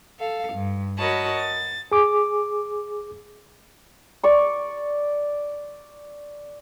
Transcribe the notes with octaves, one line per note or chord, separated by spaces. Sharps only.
A4 F5
G2
F#4 A#4 C#5 D#5 A5 B5
A6
G#4 D6
D5 C#6